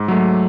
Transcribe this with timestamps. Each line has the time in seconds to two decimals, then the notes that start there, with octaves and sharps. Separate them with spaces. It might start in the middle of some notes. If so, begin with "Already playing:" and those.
Already playing: G#2 D6
0.08 F#3 A3